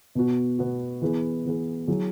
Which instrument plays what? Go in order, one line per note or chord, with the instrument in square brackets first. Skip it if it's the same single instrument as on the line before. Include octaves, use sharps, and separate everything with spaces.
[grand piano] B2 B3 F#4
B2 B3 F#4
E3 B3 G#4
E3 B3 G#4
F#3 E4 G#4